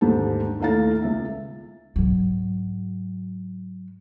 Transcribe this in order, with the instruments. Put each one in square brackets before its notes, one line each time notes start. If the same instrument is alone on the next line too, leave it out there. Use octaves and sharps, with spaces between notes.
[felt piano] D#2 G#2 D3 G4 A5
D#2 A2 A3 F5 A#5 A6
C#2 E5
[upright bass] G#2 F#3